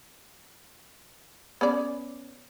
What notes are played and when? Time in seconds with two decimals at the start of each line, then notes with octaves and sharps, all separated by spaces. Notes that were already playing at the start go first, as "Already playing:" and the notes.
1.61 B3 C#4 D5